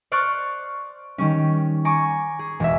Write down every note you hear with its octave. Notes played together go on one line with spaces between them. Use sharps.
C5 D5 C#6 F6 F#6 A6
D#3 G3 C#4
G#5 A#5 C#6 D6
G#4
E1 E5